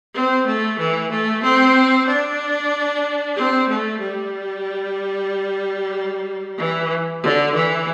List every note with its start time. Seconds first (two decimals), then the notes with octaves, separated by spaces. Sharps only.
0.14 C4
0.47 A3
0.79 E3
1.11 A3
1.43 C4
2.07 D4
3.36 C4
3.69 A3
4.00 G3
6.58 E3
7.22 D3
7.54 E3